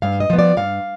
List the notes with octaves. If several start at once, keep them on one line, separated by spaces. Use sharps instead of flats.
G2 F5
D#5
F3 B3
D5
G2 F5